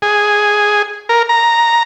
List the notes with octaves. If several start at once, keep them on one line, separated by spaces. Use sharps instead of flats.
G#4
A#4
A#5